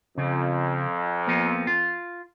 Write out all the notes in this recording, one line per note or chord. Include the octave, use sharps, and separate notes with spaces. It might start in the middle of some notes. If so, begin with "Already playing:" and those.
F2 C#3
F3 A#3 B3
F4